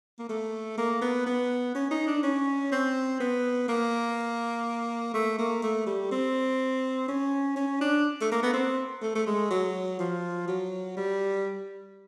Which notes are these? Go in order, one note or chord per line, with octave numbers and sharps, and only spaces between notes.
A#3
A3
A#3
B3
B3
C#4
D#4
D4
C#4
C4
B3
A#3
A3
A#3
A3
G3
C4
C#4
C#4
D4
A3
A#3
B3
C4
A3
A3
G#3
F#3
F3
F#3
G3